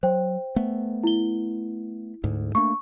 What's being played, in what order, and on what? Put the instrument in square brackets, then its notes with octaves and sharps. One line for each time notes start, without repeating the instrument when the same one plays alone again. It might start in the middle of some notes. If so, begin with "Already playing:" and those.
[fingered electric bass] F#3 [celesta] C5 G5
[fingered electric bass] A3 B3
[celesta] E4 G7
[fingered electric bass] D2 G#2
[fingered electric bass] A3 A#3 D4 [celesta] C#6